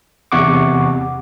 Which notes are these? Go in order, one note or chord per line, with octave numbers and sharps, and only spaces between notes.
E2 C3 F#5 C#6 D6